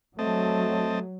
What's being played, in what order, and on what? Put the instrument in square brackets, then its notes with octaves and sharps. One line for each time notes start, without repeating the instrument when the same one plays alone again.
[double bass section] F#3 [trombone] A3 [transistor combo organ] C4 D#5 A5